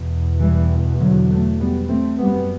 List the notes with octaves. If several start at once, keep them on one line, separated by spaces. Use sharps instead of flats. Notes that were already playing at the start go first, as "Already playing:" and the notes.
Already playing: E2 B2
E3 G3
D3 F#3
F#3 A3
G3 B3
A3 C4
F#2 G3 B3